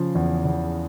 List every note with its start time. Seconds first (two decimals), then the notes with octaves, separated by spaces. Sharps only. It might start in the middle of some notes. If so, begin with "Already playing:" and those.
Already playing: C#3 F3
0.15 E2
0.45 E2